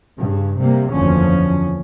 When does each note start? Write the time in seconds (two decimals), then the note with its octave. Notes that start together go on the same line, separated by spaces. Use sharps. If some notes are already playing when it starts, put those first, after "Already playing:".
0.18 G2 C#3
0.60 C3 G3 A#3
0.91 F#1 E2 D3 F3 C#4